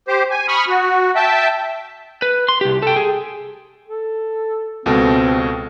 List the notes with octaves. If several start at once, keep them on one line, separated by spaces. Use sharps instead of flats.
G4 C5
G#5
B5 C#6 D#6 F6
F#4
E5 G5 A5
B4
C6
C2 G4
A4 G5
G#4
A4
C#2 B2 C4 A4